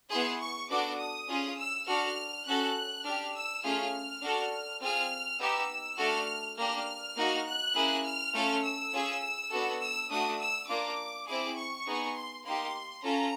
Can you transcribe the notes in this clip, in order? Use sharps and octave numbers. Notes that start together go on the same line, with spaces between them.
B3 E4 G#4 C6
C#6
B3 D4 F#4 A4 D6
D#6
C#4 F4 G#4
E6
D4 F#4 A4 F6
C#4 F#4 A4 F#6
D4 G4 F6
E6
A3 C#4 F4 G#4 F6
D4 F#4 A4
C4 F4 G#4 F6
B3 D#4 G4 E6
A3 D4 F#4 A4 F6
A#3 D4 G4 F6
A#3 D#4 F#4
F#6
A#3 C#4 E4 G#4
F6
A3 C#4 F4 A4
E6
C#4 F4 G#4
B3 D4 F#4 A4
E6
A3 D4 F#4 D#6
E6
A#3 D4 F4 D6
C4 E4 G#4 D6
C#6
B3 D#4 G#4
C6
A#3 D#4 G4 C6
C#4 F4 A4 A#5